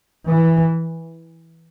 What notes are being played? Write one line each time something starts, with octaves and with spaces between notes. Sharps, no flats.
E3